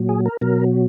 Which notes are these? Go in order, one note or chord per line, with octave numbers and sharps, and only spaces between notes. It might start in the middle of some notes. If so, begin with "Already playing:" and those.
Already playing: A#2 F#3
G#4
A#4
B2 F#3 A#4